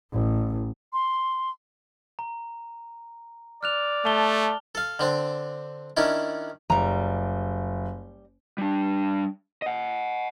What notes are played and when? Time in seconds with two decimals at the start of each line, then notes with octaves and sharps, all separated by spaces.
0.13 A1
0.93 C6
2.19 A#5
3.63 D5 F6 F#6 F7
4.05 A3 A5 G7
4.75 A4 F5
4.99 D3 C4 D4
5.97 D#3 C#4 D4 E4
6.70 F#1 G3 A#5
8.58 G3 D4
9.62 D#5 F#5